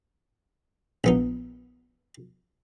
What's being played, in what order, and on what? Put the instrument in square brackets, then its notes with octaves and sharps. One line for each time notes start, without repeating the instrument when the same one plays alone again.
[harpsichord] A#1 B3 D#4